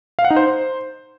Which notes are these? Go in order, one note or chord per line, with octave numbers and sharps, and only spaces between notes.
F5
F#5
D#4
C5